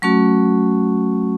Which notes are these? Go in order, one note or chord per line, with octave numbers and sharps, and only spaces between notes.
F#3 A3 C#4 F#4 C#6